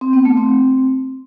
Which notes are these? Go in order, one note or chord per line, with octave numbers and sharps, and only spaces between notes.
C4
B3
A3
C4